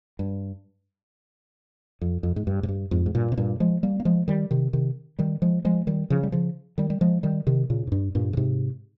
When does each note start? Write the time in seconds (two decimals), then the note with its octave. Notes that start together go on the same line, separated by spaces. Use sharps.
0.19 G2
2.01 F2
2.23 F2
2.36 G#2
2.47 G2
2.63 G#2
2.68 G2
2.91 F2 G#2
3.06 G#2
3.15 G2 A#2
3.32 C3
3.37 G2 A#2
3.60 F3 G#3
3.83 G3 A#3
4.00 A#3
4.05 F3 G#3
4.28 D#3 G3
4.51 C3 D#3
4.73 C3 D#3
5.19 D#3 G3
5.42 F3 G#3
5.65 F3 G#3
5.87 D#3 G3
6.10 C#3 F3
6.23 G3
6.32 C#3 F3
6.78 D#3 G3
6.90 G3
7.01 F3 G#3
7.23 D#3 G3
7.47 C3 D#3
7.70 A#2 C#3
7.87 G#2
7.92 G2
8.15 G2 A#2
8.33 C#3
8.37 G#2 C3